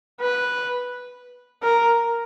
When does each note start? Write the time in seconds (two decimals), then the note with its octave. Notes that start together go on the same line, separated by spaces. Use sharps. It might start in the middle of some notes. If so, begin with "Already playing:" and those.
0.21 B4
1.63 A#4